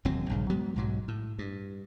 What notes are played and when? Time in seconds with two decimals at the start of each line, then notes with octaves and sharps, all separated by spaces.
0.05 E1 D#2 F#3 C4
0.29 A#1 G2 C#3
0.50 F#3 G#3 B3
0.76 B1 G#2 F#3
1.08 A2
1.39 G2